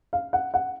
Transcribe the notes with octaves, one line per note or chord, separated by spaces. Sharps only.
F5
F#5
F#5